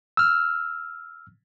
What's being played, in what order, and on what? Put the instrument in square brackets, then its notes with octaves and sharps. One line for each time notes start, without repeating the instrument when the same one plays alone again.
[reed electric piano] E6 F6